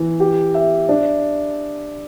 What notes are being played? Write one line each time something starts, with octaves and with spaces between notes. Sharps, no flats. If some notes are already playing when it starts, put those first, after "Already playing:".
Already playing: E3
G4
E5
D4